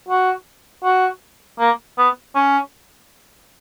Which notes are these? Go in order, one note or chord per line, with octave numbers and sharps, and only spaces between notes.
F#4
F#4
A#3
B3
C#4